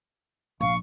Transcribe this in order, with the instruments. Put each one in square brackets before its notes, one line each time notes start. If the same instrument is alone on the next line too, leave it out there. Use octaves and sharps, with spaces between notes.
[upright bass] A#1 [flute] F5 [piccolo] C#6